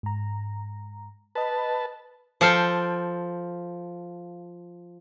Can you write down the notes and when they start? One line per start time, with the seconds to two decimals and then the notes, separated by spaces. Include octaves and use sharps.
0.03 G#2 A#5
1.35 B4 D#5 A5 B5
2.41 F3 A4 F5 G5